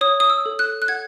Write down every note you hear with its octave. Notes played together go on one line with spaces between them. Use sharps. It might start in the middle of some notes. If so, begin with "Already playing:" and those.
C#5 D#6
D#6
E6
A4
F#6
F#6
F#5 G#6